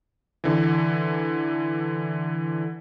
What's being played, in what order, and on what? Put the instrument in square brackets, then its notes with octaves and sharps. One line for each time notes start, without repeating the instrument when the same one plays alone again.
[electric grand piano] D3 E3